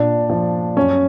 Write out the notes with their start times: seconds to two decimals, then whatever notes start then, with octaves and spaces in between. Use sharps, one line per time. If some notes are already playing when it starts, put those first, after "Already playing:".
Already playing: A#2 D4
0.30 F3
0.77 F#2 C#4